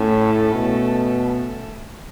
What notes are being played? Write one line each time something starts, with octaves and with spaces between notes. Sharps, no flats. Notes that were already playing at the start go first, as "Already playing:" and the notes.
Already playing: A2 A3 C#4 A4 E5
B2